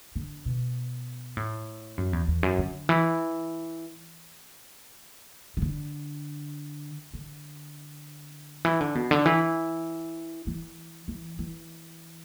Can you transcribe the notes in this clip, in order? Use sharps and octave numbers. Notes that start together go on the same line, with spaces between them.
D3
B2
A2
F#2
E2
E2
F#2
D3
E3
E3
D3
D3
E3
D3
B2
D3
E3
E3
E3
E3